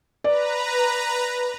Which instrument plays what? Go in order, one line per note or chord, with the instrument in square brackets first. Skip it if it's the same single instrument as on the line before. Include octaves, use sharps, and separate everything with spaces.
[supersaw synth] B4 A#5 [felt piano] D5